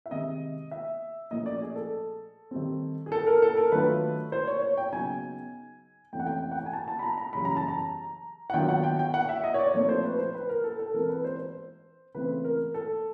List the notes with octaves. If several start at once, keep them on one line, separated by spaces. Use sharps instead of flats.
E5
C3 D#3 G#3 D#5
E5
A#2 F3 A3 C#4 F4 D#5
D5
G#4
A4
D#3 G3 C4
G#4
A4
A#4
A4
A#4
D#3 F#3 A3 D4 F4 B4
C5
C#5
C#5
G5
C#3 F#3 B3 D#4 G#5
F2 C3 E3 A3 C#4 G5
F#5
G5
F#5
G5
G#5
A5
A5
B5
A#5
A#5
F#2 C#3 E3 G3 B5
A#5
A5
A#5
F#5
D#3 F#3 B3 D4 F4 G5
F#5
G5
G5
F#5
E5
D#5
C#5
D5
A#2 F3 A3 C4 D#4 C#5
C5
B4
C5
B4
A#4
A4
A4
E3 G#3 C4 A#4
B4
C5
C5
C#3 E3 A3 C4 B4
A#4
A4